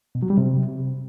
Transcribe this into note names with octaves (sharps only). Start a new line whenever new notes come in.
B2
F#3
G3
C3